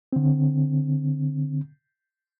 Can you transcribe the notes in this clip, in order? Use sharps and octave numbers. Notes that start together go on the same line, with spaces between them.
D3 C4